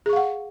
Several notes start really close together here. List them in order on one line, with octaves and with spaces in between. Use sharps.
G#4 C#6 F5 F#5